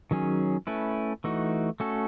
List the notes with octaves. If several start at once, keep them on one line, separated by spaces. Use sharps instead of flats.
D#3 F#3 C#4 G#4
A3 C#4 E4 B4
E3 A3 D#4 F#4
A3 C#4 F#4 A4